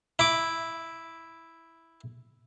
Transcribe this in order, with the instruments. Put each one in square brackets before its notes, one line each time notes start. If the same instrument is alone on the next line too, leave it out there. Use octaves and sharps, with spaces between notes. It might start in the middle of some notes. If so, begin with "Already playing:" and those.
[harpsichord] E4 D6